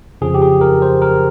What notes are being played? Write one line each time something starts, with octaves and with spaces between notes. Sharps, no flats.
F2 C#3 F3 G#4
G4
G#4
A#4
C5
A#4